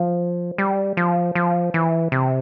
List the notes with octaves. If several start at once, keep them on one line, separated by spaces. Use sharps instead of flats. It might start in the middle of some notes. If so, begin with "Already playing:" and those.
Already playing: F3
G3
F3
F3
E3
C3